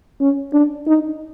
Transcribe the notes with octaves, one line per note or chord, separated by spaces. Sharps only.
C#4
D4
D#4